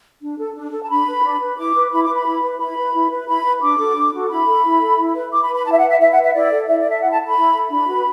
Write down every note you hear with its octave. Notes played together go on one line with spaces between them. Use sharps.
D4
A4
D4
A4
A5
D4 B5
B4
D4
B4
E4 D6
B4
E4 B5
B4 D6
B5
E4
B4
E4 B5
B4
E4
B4
E4 B5
B4
D4 D6
F#4 A4
D4
F#4 A4
E4 B5
A4
E4
A4
E4
B4
E4 D6
B5
B4
B5
E4 A5
E5
F#5
B4
E5
E4 E5
F#5
B4
E5
E4 D5
A4
E4 E5
D5
A4
E5
E4 F#5
A5
A4
B5
E4
A4
D4 B5
F#4 B4